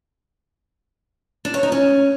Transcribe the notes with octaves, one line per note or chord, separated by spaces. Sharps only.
D4
C#5
D#4
C#4